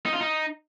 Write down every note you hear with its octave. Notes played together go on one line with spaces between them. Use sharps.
D#4
F4
D#4